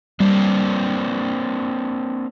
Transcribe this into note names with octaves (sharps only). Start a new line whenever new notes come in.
G3 A#3 C4 D4